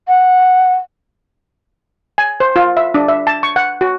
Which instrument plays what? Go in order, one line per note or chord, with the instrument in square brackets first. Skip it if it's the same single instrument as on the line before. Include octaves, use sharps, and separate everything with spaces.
[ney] F#5
[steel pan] G#5
C5
F4
E5
D4
E5
A5
C#6
F#5
F#4